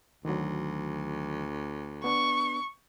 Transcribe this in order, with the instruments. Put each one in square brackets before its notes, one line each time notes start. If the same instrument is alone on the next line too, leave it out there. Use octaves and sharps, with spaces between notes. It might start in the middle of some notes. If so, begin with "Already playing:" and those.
[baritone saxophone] D2 [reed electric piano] D#3 F#3
[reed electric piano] B3 D4 [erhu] C#6